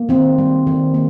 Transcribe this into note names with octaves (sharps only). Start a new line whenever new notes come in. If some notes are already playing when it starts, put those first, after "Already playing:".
Already playing: A#3
D#3 C4
G3
D#3
A#3